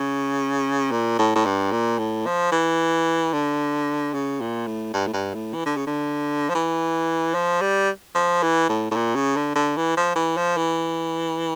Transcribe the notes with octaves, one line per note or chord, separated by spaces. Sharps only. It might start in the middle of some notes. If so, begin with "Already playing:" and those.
Already playing: C#3
A#2
A2
A2
G2
A#2
A2
F3
E3
D3
C#3
A#2
A2
G2
A2
G2
A2
E3
D3
C#3
D3
F3
E3
F3
G3
F3
E3
A2
A2
A#2
C#3
D3
D3
E3
F3
E3
F3
E3